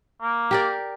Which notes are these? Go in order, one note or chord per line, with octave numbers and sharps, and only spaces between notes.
A#3
G4 A#4 D5